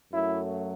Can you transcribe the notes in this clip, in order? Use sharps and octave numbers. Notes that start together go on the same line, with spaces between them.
F#2 F#3 A3 E4